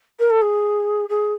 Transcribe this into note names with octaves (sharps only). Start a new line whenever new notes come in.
A#4
A4
G#4
G#4